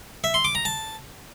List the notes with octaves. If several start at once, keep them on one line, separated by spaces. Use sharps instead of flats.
E5
C6
D6
A#5
A5